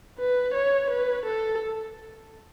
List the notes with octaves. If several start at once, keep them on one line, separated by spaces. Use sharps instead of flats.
B4
C#5
B4
A4